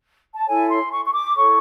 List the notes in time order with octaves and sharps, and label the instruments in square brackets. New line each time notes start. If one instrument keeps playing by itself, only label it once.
[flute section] A5
E4 A4 C#5 G#5
C6
C#6
C#6
D6
E4 A4 C#5 C#6